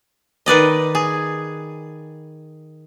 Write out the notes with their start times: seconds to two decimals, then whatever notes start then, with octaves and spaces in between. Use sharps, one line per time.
0.46 D#3 B4 D5 D#5
0.95 G#4